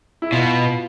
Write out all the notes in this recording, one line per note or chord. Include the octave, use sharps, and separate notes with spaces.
E4
B2 F4